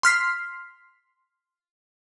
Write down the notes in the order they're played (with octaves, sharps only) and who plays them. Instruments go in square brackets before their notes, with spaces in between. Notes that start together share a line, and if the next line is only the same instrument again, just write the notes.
[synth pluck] C6 F6 B6 C7